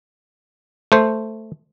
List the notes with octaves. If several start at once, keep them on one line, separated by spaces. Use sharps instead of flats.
A3 C5